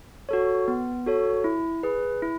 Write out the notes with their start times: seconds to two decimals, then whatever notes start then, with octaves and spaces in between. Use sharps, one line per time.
0.29 F#4 A4 C#5
0.68 B3
1.06 F#4 A4 C#5
1.44 E4
1.83 G#4 B4
2.22 E4